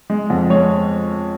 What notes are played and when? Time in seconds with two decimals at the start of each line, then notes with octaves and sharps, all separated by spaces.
0.10 G#3
0.30 F2
0.50 G#3 C#5